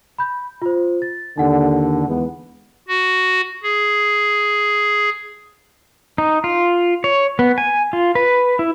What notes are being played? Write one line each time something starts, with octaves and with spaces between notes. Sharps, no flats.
B5 G6
F4 C5
A6
D#2 D3 D#4 F#5
E2 G#3 B3
F#4
G#4
D#4
F4
C#5
B3
G#5
F4
B4
E4